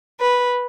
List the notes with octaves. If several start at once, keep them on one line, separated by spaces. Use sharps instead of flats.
B4